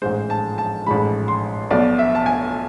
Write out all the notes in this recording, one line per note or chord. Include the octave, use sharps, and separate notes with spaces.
A1 G#2 G#3 C5
A5
A5
A1 G#2 G#3 B5
C6
B1 B2 B3 D5
E5
A5
G#5